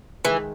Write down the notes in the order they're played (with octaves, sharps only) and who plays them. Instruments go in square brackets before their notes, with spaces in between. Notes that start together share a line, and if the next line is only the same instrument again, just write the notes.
[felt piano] D#3 G#3 D#4 G#4 [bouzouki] E3